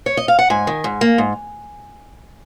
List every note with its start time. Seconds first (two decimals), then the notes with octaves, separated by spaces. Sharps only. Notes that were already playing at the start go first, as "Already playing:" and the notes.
0.06 C#5
0.17 D#5
0.28 F5
0.39 F#5
0.50 G#2 G#5
0.67 D#3
0.84 G#2
1.01 A#3
1.18 G#2